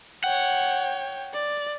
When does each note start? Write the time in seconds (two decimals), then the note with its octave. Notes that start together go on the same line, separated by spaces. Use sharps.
0.24 C#5 F#5 G5
1.34 D5